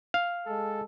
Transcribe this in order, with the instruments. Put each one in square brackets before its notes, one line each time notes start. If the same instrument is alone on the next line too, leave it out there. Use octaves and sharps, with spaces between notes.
[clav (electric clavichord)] F5
[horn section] G#3 A4